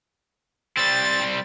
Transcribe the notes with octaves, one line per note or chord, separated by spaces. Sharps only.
G3 C4 A6